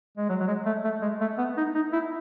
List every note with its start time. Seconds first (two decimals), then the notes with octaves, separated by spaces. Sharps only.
0.17 G#3
0.29 F#3
0.40 F#3
0.47 G#3
0.66 A3
0.84 A3
1.02 G#3
1.21 A3
1.38 B3
1.57 D#4
1.75 D#4
1.93 E4